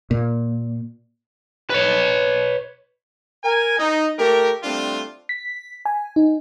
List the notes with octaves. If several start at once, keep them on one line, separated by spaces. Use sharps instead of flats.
A#2
B4 C#5
A#4 G#5
D#4
A3 G4 A#4
G3 A3 C4 D4 F4
B6
G#5
D#4